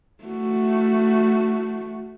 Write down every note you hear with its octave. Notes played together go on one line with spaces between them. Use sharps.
A3 F#4